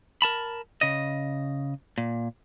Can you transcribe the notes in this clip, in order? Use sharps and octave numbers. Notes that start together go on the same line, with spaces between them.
A#4 A5 B5
C#3 D#5
A#2